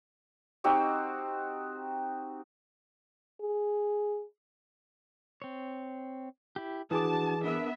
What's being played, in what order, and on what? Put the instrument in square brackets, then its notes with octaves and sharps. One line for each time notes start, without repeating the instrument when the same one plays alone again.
[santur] C4 D#4 F#4 G4
[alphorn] G#4
[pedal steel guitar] C4 C#5
E4 G4
[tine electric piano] E3 G#4 D6 [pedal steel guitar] D4 F#4 D#6 [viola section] A5
[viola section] B3 E5 [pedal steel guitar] D4 A#4